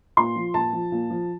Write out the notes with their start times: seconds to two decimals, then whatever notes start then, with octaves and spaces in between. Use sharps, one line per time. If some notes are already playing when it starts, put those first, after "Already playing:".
0.17 A#2 C6
0.36 F3
0.54 A#2 A5
0.73 F3
0.92 A#2
1.10 F3